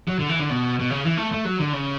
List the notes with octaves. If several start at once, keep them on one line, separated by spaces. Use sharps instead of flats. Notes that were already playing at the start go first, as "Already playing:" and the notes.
F#3
D3
E3
D3
B2
B2
C#3
E3
A3
A3
F#3
D3
C#3